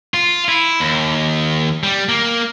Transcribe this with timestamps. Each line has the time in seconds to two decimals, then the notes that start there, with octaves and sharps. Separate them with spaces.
0.14 F4
0.49 E4
0.80 D#2
1.84 G3
2.09 A#3